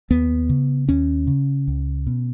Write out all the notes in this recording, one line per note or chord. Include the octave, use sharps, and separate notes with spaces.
D#2 B3
C#3
D#2 C#4
C#3
C#2
B2